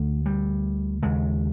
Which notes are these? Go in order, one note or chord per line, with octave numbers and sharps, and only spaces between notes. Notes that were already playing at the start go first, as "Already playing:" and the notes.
Already playing: D2 D3 A3
G3
D#2 C#3 G#3